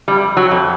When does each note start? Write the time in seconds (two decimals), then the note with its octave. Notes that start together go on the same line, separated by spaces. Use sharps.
0.08 F2 G3
0.37 F#3
0.51 F2